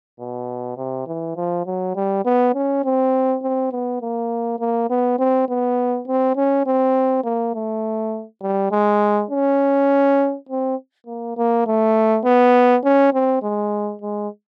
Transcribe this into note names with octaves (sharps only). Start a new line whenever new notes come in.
B2
C3
E3
F3
F#3
G3
B3
C#4
C4
C4
B3
A#3
A#3
B3
C4
B3
C4
C#4
C4
A#3
A3
G3
G#3
C#4
C4
A#3
A#3
A3
B3
C#4
C4
G#3
G#3